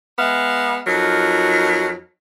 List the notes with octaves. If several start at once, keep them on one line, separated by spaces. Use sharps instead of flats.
G#3 B3 E5 F5
F2 F#3 D#4 A#4